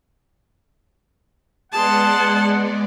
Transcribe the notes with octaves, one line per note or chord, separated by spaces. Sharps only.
G#3 B3 G#4 D5 F#5 A5 C6